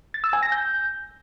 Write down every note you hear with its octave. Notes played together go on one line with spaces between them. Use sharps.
A6
E6
G#5
A#6
G6